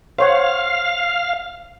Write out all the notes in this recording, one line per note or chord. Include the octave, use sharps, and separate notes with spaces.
C5 C#5 F5 F#5